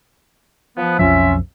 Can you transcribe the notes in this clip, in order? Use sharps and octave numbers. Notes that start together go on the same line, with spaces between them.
F3 B3
B1 F2 F3 C#4 F4 E5